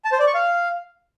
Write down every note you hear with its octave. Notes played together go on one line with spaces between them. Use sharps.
A5
C5
D5
C#6
F5